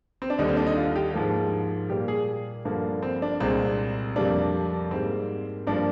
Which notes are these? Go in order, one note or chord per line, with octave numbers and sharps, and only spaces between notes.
C4
D4
D#2 D3 G3 D#4
C4
D4
D#4
F4
G4
G#2 F3 A#3
A#2 G3 A#3 G4
G#4
G2 D3 F3 A#3
C4
D4
C2 A#2 G#3 C4
F2 C3 G3 A#3 D4
G#2 G3 A#3 C4
G2 F3 A#3 D4